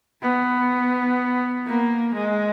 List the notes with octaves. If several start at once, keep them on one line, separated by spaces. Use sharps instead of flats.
B3
A#3
G#3